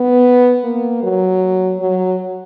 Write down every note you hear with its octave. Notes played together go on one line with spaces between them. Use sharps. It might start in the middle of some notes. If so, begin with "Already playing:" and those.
Already playing: B3
A#3
F#3
F#3